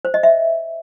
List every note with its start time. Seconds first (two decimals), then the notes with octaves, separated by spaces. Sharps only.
0.05 C5
0.14 D#5
0.23 E5